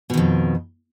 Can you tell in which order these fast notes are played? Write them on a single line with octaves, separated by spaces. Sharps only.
B2 D#3 F2